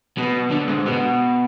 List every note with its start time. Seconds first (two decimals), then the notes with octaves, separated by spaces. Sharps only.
0.17 B2
0.51 D3
0.69 G#2
0.87 B2